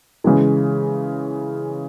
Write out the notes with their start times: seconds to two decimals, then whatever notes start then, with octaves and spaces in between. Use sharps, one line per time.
0.24 C#3 E3 G#3